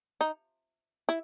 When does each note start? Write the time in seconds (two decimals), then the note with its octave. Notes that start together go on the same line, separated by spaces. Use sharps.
0.21 D#4
1.09 E4